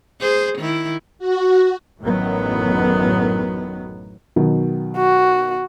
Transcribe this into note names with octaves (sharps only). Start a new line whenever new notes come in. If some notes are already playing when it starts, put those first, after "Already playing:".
G#4 C5
D#3 E4
F#4
A1 F#2 A2 D#3 F#3 B3
B2 D#3 F#3
F#4